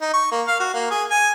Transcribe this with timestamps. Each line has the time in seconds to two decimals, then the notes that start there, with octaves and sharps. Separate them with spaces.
0.01 D#4
0.13 C#6
0.32 A#3
0.47 F5
0.60 F#4
0.74 A#3
0.91 G#4
1.10 G#5